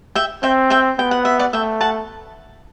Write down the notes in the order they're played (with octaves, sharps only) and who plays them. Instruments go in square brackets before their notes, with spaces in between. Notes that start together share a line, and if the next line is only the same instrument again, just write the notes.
[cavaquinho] E5 G5
[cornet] C4 [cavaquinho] E5 G5
[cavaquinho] E5 G5
[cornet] B3 [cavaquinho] G5
[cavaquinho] F#5
E5
D5 F#5
[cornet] A3 [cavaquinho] E5 G5
[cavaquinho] F#5 A5